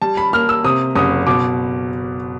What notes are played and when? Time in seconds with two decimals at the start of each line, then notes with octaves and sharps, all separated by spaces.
0.02 G3 A5
0.17 B5
0.33 A#3 F6
0.49 E6
0.64 C3 D#6
0.96 F#1 D#6
1.27 B2 D6